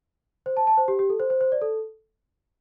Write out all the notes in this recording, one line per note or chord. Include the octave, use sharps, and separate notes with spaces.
C5
A5
A5
C5
G4
G4
A4
C5
C5
C5
D5
A4